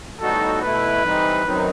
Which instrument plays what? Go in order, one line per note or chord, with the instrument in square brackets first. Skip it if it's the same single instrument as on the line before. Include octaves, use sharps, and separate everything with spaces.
[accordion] A2 G3 B3 D#4 F#4 [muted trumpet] A4
[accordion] B2 A3 E4 [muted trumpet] B4
[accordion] E3 G3 C4 D#4
F#2 D#3 F#3 C4 D#4